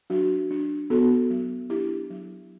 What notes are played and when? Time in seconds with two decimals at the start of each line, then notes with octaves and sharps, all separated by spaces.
0.10 F#3 D4 F#4
0.50 D4
0.90 B3 F#4 A4
1.30 F#3
1.70 D4 E4 G4
2.10 F#3